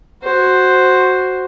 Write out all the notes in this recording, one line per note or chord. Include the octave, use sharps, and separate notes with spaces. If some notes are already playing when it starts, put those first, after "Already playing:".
F#4 C5